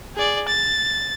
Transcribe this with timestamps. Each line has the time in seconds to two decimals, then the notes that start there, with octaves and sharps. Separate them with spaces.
0.16 G#4 D5
0.48 A6